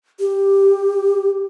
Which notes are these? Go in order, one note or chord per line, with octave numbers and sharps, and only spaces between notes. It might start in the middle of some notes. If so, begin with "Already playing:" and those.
G4